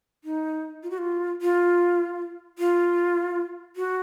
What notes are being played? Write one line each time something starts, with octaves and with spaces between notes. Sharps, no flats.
D#4
F4
F#4
F4
F4
F4
F#4